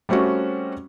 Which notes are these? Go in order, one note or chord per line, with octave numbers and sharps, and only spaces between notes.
G3 A3 C4 C#4 F#4